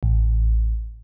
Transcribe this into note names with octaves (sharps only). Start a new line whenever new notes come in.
A1